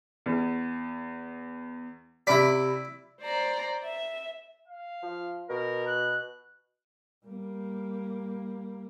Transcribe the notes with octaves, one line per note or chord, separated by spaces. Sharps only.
E2
C3 E4 D5 B5 B6
C5 D5 A#5
E5
F5
F3
B2 A#4
F#6
G3 A#3